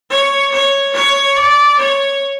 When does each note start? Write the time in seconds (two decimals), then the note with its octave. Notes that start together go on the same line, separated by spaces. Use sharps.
0.10 C#5
0.52 C#5
0.94 C#5
1.36 D5
1.78 C#5